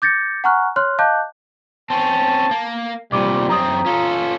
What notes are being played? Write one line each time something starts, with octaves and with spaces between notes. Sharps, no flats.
D6 G6 A6 A#6 C#7
F#5 G#5 A#5 C#6 F6 F#6
C#5 C6 F6 F#6
D#5 F5 A5 D6 F#6 G6
C4 C#4 A5
A#3
C2 A#2 G3 D6
F#2 C4 A#5 D#6
C#4 F4 A4